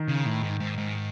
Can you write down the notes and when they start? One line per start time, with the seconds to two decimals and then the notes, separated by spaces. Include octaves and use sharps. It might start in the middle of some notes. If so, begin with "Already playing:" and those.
Already playing: D#3
0.08 C#3
0.25 A2
0.43 G#2
0.60 G#2
0.78 G#2